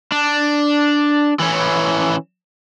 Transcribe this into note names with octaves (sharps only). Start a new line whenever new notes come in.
D4
E3 C#4